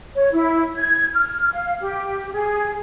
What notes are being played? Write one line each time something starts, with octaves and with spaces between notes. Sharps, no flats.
C#5
E4
G#6
F6
F5
G4
G#4